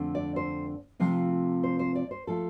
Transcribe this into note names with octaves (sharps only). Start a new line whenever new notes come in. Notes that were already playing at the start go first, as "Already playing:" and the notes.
Already playing: F2 D3 A3 C4
D5
C5
C3 F3 A3 C4 F4
C5
C5
D5
C5
F3 A3 A4